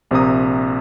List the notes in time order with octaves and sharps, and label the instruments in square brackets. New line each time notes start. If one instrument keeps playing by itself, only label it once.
[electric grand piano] A#1 C3 A#3 C4 A#5 D#6